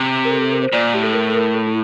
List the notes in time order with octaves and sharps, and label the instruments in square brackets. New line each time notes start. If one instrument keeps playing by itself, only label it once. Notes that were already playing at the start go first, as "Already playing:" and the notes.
Already playing: [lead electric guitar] C3
[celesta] A#4
A4
A4
A#4
C5
[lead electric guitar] A#2 [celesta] D5
[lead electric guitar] A2 [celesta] G4
[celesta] A4
A#4
A4
A#4
A4
E4